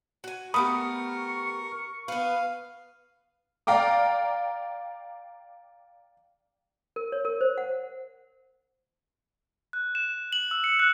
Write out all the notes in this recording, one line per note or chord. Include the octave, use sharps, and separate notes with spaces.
F#4 G#5
A3 B3 G4 A#4 B5 C#6 D#6
B3 B4 F5
D5 F5 G5 A#5 D6
A#4
C#5
A#4
C5
F#5
F#6
E7
F#7
E6
C#7
F#6